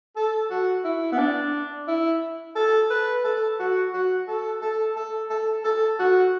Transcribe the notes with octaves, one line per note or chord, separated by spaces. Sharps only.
A4
F#4
E4
B3
D4
E4
A4
B4
A4
F#4
F#4
A4
A4
A4
A4
A4
F#4